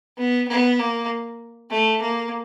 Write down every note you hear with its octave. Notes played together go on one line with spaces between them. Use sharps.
B3
B3
A#3
A3
A#3